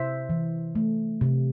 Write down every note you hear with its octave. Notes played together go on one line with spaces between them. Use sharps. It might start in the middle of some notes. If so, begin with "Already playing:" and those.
Already playing: C3 C5 E5
E3
A3
C3